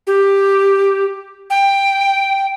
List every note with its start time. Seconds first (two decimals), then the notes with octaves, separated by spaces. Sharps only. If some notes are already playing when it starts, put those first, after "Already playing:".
0.07 G4
1.50 G5